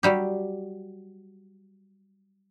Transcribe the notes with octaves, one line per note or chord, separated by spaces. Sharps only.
F#3 G3 G4